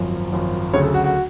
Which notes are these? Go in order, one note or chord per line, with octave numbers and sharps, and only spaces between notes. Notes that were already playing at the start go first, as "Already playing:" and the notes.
Already playing: G#1 F#2 F3
G#1 F#2 F3
D2 C#3 F#3 A3 C#5
A4
F#4
F#4